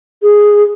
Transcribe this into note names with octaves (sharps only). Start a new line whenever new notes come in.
G#4